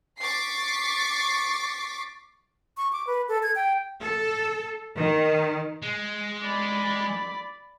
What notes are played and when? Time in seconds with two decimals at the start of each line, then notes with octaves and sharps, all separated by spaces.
0.19 C#6 D6 A6 B6 C7
2.77 C#6
2.92 D6
3.07 B4
3.29 A4
3.43 G#6
3.55 G5
4.01 A4
4.96 D#3
5.82 G#3
6.43 D5 B5